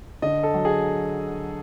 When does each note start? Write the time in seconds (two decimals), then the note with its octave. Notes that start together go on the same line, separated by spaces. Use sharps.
0.22 D3 D#5
0.43 A4
0.54 F#3
0.65 G#4